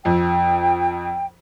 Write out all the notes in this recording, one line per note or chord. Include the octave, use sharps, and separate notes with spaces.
F2 G5